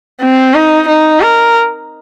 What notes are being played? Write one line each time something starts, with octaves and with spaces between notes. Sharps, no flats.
C4
D#4
D#4
A#4